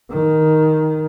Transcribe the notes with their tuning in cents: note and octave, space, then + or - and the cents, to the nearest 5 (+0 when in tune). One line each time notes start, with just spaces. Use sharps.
D#3 +5